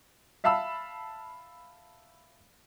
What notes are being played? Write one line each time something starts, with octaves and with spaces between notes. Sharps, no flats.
E5 F5 A5 B5 E6